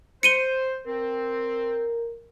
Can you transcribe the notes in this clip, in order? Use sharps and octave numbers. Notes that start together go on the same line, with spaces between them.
C5 C#7 D#7 G7
C4 A#4